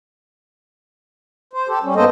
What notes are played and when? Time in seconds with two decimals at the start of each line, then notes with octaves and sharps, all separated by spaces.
1.53 C5
1.68 G4 A4
1.83 G3 C#4
1.96 G#2 A#3 B3 A4 C5 D#5